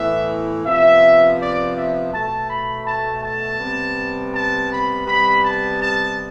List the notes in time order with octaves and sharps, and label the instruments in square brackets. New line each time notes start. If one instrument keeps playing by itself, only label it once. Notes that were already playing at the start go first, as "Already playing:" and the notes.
Already playing: [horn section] A2 E3 B3 E5
C3 F3 B3 E5
D5
E5
B2 A3 A5
B5
A5
A5
C3 G3 B3
A5
B5
C3 G3 B3 B5
A5
A5